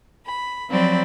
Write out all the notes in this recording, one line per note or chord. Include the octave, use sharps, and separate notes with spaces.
B5
F3 F#3 C4 D5 B5